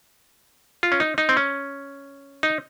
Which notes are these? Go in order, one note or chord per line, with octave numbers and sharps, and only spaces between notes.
F4
C#4
D#4
D#4
C4
C#4
D#4